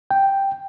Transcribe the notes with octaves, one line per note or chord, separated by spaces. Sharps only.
G5